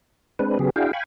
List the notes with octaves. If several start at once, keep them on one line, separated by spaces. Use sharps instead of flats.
G#3 C4 D4 B4
C#3 F#3 B3 G4 G#4
D4 E4 F#4 G#4 F5 G5
F5 G5 G#5 B5 C#6